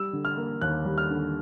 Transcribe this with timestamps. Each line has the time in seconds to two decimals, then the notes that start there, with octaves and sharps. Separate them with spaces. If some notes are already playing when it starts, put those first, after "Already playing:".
Already playing: G3 E6
0.13 D3
0.25 F6
0.37 A#3
0.61 D#2 F#6
0.85 G3
0.98 F6
1.10 D3